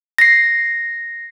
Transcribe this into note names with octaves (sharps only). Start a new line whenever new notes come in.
A#6 C7